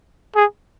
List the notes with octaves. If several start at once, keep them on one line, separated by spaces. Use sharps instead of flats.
G#4